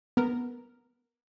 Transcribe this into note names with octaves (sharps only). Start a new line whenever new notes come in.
B3 A#4